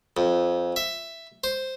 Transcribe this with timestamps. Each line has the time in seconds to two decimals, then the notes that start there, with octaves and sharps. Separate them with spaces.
0.17 F2
0.76 E5
1.44 C5